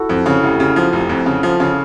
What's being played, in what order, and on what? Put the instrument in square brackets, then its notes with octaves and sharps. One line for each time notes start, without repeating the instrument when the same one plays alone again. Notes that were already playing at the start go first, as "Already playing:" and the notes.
Already playing: [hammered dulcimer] E4 F#4 A4
[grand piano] F2
C#3
[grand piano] F1 [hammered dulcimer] E4 F#4
[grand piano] C#3
F3
F1
F2
C#3
F3
C#3